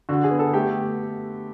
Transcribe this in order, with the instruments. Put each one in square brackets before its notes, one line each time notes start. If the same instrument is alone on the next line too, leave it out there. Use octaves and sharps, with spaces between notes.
[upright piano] D3 F#4
G#4
B3
A4
A3 G4